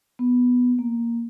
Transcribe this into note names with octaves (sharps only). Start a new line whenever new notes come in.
B3
A#3